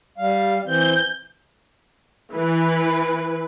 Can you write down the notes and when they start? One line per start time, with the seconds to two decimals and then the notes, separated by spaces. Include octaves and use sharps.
0.18 G3 F5
0.65 E3 C4 G6
2.32 E3 B4